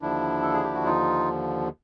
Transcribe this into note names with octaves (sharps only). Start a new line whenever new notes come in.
D#2 D3 F3 D4 E4
A4
G#4
G4
F#4
D#4 F4